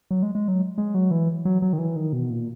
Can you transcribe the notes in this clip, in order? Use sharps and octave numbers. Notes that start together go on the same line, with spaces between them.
F#3
G#3
G#3
F#3
G#3
F#3
E3
F#3
F#3
D#3
E3
D#3
B2
A#2